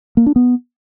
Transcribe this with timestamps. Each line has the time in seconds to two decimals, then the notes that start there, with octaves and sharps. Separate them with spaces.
0.17 A#3
0.26 D4
0.36 B3